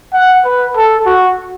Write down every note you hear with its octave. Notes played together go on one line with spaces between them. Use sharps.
F#5
B4
A4
F#4